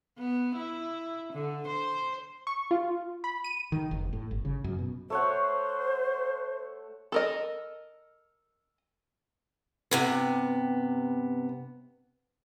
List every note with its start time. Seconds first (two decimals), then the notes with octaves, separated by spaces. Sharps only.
0.18 B3
0.56 E4
1.33 D3
1.68 C5
2.47 C#6
2.71 F4
3.24 B5
3.44 D#7
3.72 D#3
3.91 F1
4.13 A2
4.31 G1
4.45 C#3
4.64 F#2
4.79 B2
5.10 A3 C5 C#5 F#5
7.12 A4 A#4 D#5
9.91 G2 C3 B3